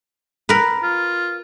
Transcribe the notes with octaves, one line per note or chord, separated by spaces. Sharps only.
A#4 B4
F4